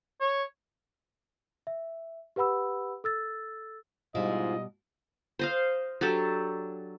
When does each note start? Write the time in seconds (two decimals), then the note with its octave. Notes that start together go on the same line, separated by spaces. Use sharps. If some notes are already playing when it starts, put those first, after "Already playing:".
0.21 C#5
1.67 E5
2.36 G4 B4 F#5 B5 E6
3.04 A4 E6 A6
4.15 G#2 B2 G3 E4 F4 C5 D#5
5.39 C5 D#5 F5
6.01 F#3 D4 G4 A4